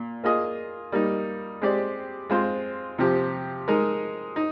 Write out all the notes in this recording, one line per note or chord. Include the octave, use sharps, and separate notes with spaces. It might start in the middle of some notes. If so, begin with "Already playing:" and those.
Already playing: A#2
A#3 F4 G#4 D#5
G3 A#3 D#4
G#3 C4 G4 D5
G#3 C4 F4 C5
C3 F3 C4 G4
G#3 D#4 A#4
D#4